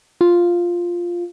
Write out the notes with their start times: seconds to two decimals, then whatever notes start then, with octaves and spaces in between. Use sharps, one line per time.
0.21 F4